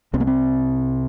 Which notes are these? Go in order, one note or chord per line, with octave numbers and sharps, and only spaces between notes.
C2 C3 C4
A#3
C4